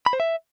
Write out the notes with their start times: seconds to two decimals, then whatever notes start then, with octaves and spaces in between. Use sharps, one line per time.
0.06 B5
0.13 C5
0.20 E5